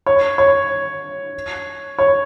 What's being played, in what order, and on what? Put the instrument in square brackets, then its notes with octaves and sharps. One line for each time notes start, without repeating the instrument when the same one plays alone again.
[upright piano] C#5
C#5
C#5